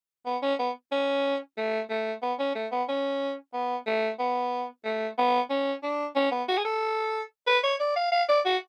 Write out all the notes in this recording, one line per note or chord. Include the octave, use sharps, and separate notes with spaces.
B3
C#4
B3
C#4
A3
A3
B3
C#4
A3
B3
C#4
B3
A3
B3
A3
B3
C#4
D4
C#4
B3
F#4
G#4
A4
B4
C#5
D5
F5
F5
D5
F#4